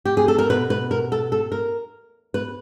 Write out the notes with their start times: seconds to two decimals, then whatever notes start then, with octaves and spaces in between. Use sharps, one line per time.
0.05 G4
0.17 G#4
0.28 A4
0.39 A#4
0.50 B2 B4
0.70 B4
0.91 A#4
1.12 A4
1.32 A4
1.52 A#4
2.34 B4